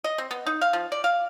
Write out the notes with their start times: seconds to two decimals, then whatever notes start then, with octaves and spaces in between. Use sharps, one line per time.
0.04 D#5
0.18 C4
0.31 B3
0.46 D#4
0.61 F5
0.73 F3
0.92 D5
1.04 F5